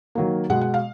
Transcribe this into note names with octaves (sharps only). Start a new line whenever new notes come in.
D#3 F#3 A#3
B2 G#3 F#5
F#5
F5